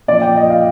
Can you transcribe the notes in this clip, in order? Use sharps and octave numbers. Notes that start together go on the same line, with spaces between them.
A#2 F3 D5
G5
D#5
F5